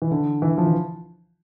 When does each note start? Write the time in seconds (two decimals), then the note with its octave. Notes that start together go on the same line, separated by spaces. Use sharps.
0.02 E3
0.11 D3
0.42 E3
0.58 F3
0.66 E3